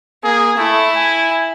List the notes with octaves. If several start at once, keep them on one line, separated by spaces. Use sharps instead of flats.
A#3 G#4
A3 E4
G#5